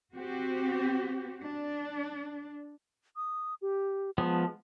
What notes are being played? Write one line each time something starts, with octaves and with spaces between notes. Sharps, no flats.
C4 F#4 G4
D4
D#6
G4
F3 G#3 B3 A5